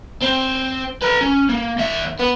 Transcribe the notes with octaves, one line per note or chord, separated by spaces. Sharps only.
C4
B4 A#5
C#4
A#3
D#2 E5
B3